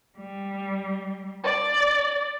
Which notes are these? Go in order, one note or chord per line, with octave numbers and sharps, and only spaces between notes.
G3
D5